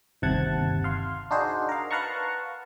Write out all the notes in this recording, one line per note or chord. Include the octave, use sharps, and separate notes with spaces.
G1 D#2 C3 F#5 A5 G#6
F5 C6
D4 D#4 F#4 G#4 C5
A#4 F5
B4 F5 F#5 A5 A#5 C#6